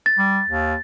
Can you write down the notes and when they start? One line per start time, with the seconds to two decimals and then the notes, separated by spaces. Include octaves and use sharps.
0.06 A6
0.18 G3
0.48 D#2